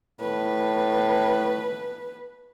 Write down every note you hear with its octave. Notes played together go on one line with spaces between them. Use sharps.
A2 B4